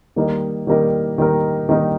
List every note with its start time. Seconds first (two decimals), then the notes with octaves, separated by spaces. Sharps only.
0.16 D#3 G3 A#3 D#4 A#4
0.67 D#3 G3 A#3 D#4 A#4
1.18 D#3 G3 A#3 D#4 A#4
1.69 D#3 G3 A#3 D#4 A#4